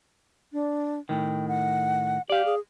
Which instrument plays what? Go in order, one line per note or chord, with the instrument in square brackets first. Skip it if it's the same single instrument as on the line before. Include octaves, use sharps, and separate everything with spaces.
[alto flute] D4
[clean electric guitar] A2 D#3 [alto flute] G5
[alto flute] F#5
[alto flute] G4 [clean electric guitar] D5 F5
[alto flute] G#4